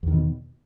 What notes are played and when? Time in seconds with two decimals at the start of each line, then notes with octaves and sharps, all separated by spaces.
0.03 E2
0.08 D#3
0.12 B2